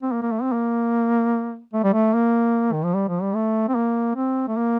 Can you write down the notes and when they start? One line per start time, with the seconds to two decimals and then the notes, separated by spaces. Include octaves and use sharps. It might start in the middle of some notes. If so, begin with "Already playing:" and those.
0.03 C4
0.12 A#3
0.22 A#3
0.32 A3
0.42 C4
0.52 A#3
1.74 A3
1.84 G3
1.93 A3
2.14 A#3
2.73 D#3
2.84 F3
2.94 G3
3.08 F3
3.22 G3
3.35 A3
3.68 C4
3.75 A#3
4.15 C4
4.48 A3
4.57 A#3